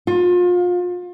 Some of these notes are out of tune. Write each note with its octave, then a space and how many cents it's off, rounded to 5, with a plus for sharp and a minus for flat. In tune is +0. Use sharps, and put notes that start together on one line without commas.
F4 +30